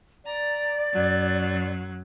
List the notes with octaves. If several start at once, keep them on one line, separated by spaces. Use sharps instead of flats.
D5 A#5
F#2 F#3